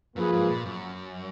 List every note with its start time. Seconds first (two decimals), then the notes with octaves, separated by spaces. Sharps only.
0.16 F#2 F3 A#3 F4 G#4 B4
0.32 G#2
0.49 A#2
0.65 F#2